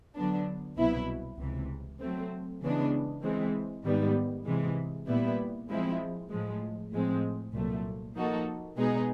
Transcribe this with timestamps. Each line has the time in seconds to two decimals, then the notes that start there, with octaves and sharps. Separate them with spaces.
0.15 D3 F#3 B3 D4
0.77 C2 B2 F#3 B3 E4
1.38 C#2 C3 E3
2.00 F#3 A3 C4
2.62 C#3 E3 G#3 B3 D4
3.23 E3 G#3 C4
3.84 G#2 D#3 G3 B3
4.45 C3 E3 G#3
5.07 A#2 G3 B3 E4
5.69 F3 G#3 C4 E4
6.30 A2 F3 G#3
6.92 A2 F3 G#3 C4
7.54 C2 A#2 F#3 A3
8.15 F3 A#3 D#4 F#4 A4
8.77 B2 G#3 B3 D#4 G#4